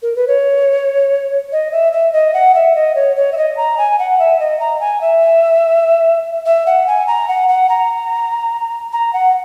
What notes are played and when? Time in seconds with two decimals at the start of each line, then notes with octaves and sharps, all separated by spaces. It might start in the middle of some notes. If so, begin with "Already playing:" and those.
0.02 A#4
0.15 B4
0.27 C#5
1.52 D#5
1.72 E5
1.92 E5
2.13 D#5
2.34 F#5
2.55 E5
2.75 D#5
2.95 C#5
3.16 C#5
3.32 E5
3.37 D#5
3.57 A#5
3.78 G#5
3.99 F#5
4.19 E5
4.40 D#5
4.60 A#5
4.80 G#5
5.01 E5
6.45 E5
6.66 F#5
6.87 G#5
7.07 A#5
7.28 F#5
7.48 F#5
7.69 A#5
8.93 A#5
9.13 F#5